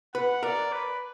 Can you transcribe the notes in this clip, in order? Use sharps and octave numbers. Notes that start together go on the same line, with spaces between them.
B4 F#5
A#4 D5
B4